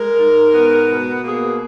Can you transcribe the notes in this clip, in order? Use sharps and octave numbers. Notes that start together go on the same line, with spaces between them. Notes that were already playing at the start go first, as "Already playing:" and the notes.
Already playing: G#3 A#4
G#2
B3
B2
A#3 G#4